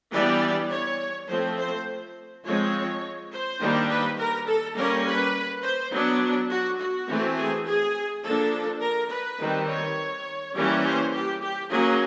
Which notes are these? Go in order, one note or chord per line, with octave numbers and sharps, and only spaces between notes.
E3 G3 B3 D4 D5
C#5
F3 A3 C4 C5
C5
F3 G#3 C4 C#5
C5
D#3 G3 A#3 D4
B4
A#4
A4
G3 A#3 C#4 A#4
B4
C5
F#3 B3 D4
F#4
F#4
E3 A3 C4
G#4
G#4
F3 A#3 D4 A4
A#4
B4
D#3 G3 C4
C#5
E3 G3 A#3 C#4
C5
G4
G4
F#3 A#3 C#4 G#4